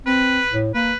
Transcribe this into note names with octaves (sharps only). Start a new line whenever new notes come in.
C4 B4
A2
A#3 B4